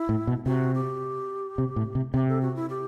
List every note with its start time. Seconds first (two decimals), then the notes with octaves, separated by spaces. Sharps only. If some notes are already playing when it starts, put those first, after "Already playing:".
Already playing: E4
0.09 A2
0.27 B2
0.46 C3 F#4
0.75 G4
1.58 C3
1.76 A2
1.95 C3
2.14 C3 G4
2.28 A4
2.42 F#4
2.56 E4
2.70 G4